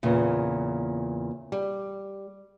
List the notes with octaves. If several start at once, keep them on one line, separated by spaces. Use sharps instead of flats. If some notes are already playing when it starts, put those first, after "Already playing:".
E2 A#2 C#3
G3